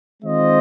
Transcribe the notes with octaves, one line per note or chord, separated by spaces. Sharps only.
D#3 G#3 C4 F4 C5 D#5